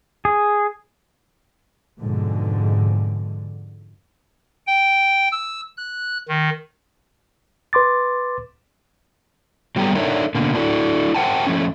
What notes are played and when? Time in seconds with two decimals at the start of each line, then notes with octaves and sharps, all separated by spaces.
0.25 G#4
2.00 F2 G#2 B2 D3
4.67 G5
5.32 E6
5.77 F#6
6.28 D#3
7.73 B4 C6 D6 A6
9.76 F#3 G3 B3 G4 A4 A#5
9.95 D4 D#4 A4 A#4 C#5 E5
10.35 B2 D3 A#3
10.55 D4 E4 F#4 A4
11.14 A#4 C5 F#5 G5 A5
11.47 F3 A3 C#4